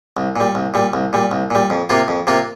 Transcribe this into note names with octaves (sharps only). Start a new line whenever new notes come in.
C2
A#2 G3
C2
A#2 G3
C2
A#2 G3
C2
A#2 G3
F2
C3 A#3 F4
F2
C3 A#3 F4